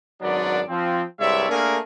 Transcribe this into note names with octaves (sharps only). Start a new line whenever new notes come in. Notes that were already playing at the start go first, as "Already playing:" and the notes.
G#1 F#2 F#3 B3 D4 D5
F3 C4
C2 G2 G#3 C#5 D5 E5
A3 A#3 D4 G#4 A#4